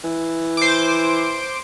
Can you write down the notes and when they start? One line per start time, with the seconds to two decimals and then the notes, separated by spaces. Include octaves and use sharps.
0.04 E3
0.57 C5 D6